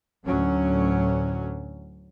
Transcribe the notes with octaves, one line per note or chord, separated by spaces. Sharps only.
D2 A2 F#3 C#4